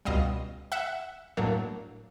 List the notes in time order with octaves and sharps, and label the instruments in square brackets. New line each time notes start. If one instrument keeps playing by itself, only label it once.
[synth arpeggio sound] C#2 B2 G3 D#5 F5
E5 F#5
A2 F#3 A#3 D4